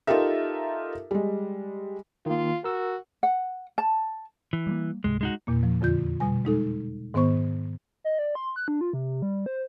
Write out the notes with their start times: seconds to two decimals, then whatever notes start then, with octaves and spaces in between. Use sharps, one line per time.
0.07 D#4 F4 G4 A4 A#4 E5
1.11 G3 G#3
2.26 D#3 A#3 F4
2.64 F#4 A#4 E6
3.23 F#5
3.78 A5
4.53 E3
4.67 G3 G#3 A#3
5.04 C#2 G#2 C3 G#3
5.21 G#3 D#4 F#4
5.47 E2 A#2 A#3
5.63 F3
5.81 F2 D3 F4 G6
6.20 B2 G3 G#5
6.45 G#3 D#4 A4
7.14 G#2 D#3 B3 C5 C#6
8.04 D#5
8.19 D5
8.35 C6
8.56 F#6
8.68 D4
8.81 F4
8.93 C3
9.22 G3
9.46 C5